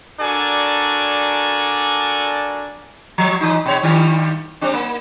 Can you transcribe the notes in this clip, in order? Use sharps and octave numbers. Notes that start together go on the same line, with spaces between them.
D4 F#4 A4 A#4 D5 G#5
F3 F#3
E3 D#4
B2 C#5
G2 D#3 G3
G3 C4 D4
A#3